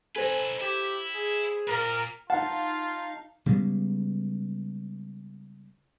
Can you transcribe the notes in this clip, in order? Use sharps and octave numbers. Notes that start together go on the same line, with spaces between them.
D#4 A4 B4 C5 G#5
E4 G4
G#4
A#2 A#4
D#4 F4 F5 F#5 A5
C#3 G3 G#3 B3